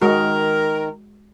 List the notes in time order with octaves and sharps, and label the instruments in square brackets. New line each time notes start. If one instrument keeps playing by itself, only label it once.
[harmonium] D#3 [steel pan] G#3 F#4 [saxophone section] A#4